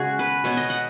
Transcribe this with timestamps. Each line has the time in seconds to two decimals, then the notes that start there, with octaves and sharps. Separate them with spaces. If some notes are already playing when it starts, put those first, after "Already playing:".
Already playing: C#3 G#3 F#4 G#4
0.19 B4
0.44 B2 B3 C#5
0.57 D#5
0.70 F#5